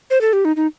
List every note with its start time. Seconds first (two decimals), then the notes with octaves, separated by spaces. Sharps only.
0.10 C5
0.21 A4
0.33 G4
0.45 D#4
0.56 D#4